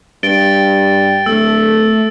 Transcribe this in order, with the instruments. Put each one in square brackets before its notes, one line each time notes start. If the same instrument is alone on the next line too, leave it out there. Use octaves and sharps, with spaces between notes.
[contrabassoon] G2 [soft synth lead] G5 [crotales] A6 D7 G7
[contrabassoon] D1 [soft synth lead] A3 [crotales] E6